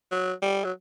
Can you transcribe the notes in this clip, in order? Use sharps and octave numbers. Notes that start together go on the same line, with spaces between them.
F#3
G3
F#3